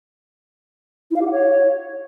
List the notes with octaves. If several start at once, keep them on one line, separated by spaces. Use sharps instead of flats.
E4
F5
G4
F#5
C#5